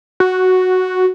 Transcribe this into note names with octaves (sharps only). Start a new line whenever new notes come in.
F#4